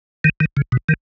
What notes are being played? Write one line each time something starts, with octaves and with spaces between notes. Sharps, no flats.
D#3
D#3
C#3
B2
D#3